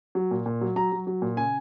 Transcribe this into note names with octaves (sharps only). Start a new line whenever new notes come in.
F#3
A#2
A#2
F#3
F#3 A#5
F#3
F#3
A#2
C#3 G#5